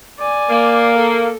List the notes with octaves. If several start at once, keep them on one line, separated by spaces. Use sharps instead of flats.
D5 G#5
A#3
A4